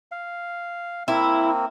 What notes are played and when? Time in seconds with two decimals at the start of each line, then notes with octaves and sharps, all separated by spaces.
0.12 F5
1.08 A#3 C4 E4